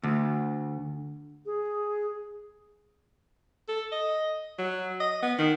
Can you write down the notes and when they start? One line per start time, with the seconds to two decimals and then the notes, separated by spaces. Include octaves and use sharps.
0.03 D2
1.46 G#4
3.68 A4
3.92 D#5
4.58 F#3
5.00 D#5
5.22 B3
5.38 D#3